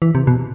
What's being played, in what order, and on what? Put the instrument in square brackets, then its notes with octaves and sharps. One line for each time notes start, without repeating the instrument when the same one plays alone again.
[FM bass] E3
C3
B2